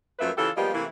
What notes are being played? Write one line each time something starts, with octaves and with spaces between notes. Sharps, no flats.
F#2 F3 A3 A#3 B4 E5
C#3 E3 F4 G4 A4
F3 G3 G#3 A#3 B3 G4
C3 E3 A3 A#3 E4